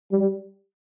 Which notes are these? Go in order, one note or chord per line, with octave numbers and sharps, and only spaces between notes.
G3